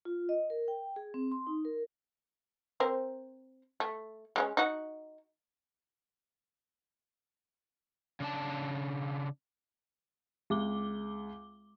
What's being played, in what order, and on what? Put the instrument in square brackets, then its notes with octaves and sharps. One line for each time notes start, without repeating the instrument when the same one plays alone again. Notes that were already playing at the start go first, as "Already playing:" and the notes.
[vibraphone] F4
D#5
A#4
G5
G#4
C4
C6
D#4
A#4
[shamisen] C4 A#4 C5
A3
G#3 A#3 C#4
D#4 F#4
[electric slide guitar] C#3 D4 A5
[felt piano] C#2 [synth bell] G#3 D6 G7